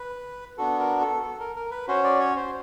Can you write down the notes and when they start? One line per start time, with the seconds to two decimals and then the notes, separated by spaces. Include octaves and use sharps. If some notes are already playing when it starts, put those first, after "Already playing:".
Already playing: B4
0.58 B3 D4 F#4 A4
0.79 A#4
1.01 A4
1.23 A4
1.40 A#4
1.56 A#4
1.71 B4
1.88 C#4 F#4 C5
2.04 D5
2.20 C#5
2.36 C5